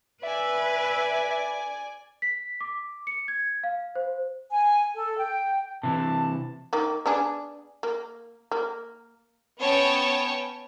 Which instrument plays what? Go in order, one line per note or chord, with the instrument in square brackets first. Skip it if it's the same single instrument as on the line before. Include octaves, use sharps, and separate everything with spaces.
[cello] B4 [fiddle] D5 G#5 [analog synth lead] E5
[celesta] B6
D6
C#7
G#6
F5
C5
[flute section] G#5
A4
G5
[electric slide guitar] C3 E3 [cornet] A5
[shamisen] D#3 A#3
B3 D4 G#4
A#3
A#3
[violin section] B3 C#4 C#5 G5 A5